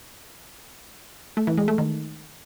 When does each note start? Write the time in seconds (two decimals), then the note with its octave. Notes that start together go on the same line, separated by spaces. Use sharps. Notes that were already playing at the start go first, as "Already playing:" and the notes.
1.37 A3
1.47 E3
1.58 G#3
1.68 A3
1.78 D#3